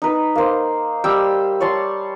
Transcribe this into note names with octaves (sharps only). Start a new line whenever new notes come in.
D#4 B4
A#3 C5
G3 G5 E6
C#5 D5 A5 C6